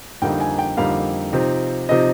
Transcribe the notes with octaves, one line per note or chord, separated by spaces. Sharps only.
F2 D3 G3 A#3 D#4 G5
G#5
G5
F2 D3 G3 A#3 D#4 F5
C3 F3 C4 D#4
C3 F3 C4 D#4 D#5